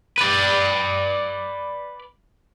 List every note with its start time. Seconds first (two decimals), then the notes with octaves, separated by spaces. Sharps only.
0.18 B4 D5